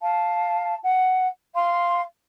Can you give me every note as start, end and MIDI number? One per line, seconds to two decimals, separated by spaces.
0.01 0.74 77
0.01 0.74 81
0.82 1.26 78
1.55 2.02 77
1.55 2.02 84